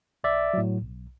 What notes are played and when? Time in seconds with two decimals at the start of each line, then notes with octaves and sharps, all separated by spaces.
0.24 B1 D5 E5
0.54 A2 F#3
0.82 B1